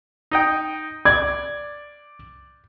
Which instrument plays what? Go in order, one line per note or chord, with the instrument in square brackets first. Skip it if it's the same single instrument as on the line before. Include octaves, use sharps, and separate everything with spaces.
[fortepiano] D#4 D#5 G5
[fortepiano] D5 [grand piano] G#6